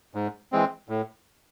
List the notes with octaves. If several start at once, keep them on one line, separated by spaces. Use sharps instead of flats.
G#2
E3 G#3 C4
A2